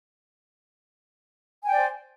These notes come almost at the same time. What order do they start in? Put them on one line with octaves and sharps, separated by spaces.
G#5 G5 D5 C5